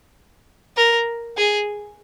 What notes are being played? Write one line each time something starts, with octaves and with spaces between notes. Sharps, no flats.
A#4
G#4